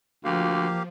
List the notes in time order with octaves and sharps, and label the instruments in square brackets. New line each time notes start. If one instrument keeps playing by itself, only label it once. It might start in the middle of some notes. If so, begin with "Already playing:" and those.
[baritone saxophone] D2 [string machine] F3 [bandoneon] A#3 G4 F5